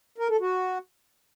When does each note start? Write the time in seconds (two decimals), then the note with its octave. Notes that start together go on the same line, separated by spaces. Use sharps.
0.18 A#4
0.29 A4
0.40 F#4